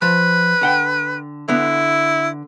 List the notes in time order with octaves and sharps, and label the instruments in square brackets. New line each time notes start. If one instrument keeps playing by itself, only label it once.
[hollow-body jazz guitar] F3 [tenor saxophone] B4
[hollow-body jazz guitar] D3 F#5 G5
[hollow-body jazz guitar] D3 B3 [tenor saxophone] E4